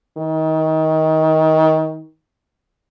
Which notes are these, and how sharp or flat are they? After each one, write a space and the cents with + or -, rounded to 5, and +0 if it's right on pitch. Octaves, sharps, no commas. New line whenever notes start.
D#3 +25